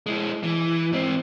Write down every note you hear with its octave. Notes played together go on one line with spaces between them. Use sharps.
G#3 E4
E3
G#2 C4